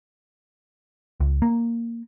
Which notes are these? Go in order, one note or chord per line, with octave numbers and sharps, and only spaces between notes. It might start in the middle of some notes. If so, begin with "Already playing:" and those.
C#2
A#3